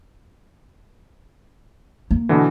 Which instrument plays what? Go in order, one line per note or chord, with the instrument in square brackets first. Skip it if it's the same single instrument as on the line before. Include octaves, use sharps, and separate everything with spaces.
[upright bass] A#3
[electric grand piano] B2 D3 E3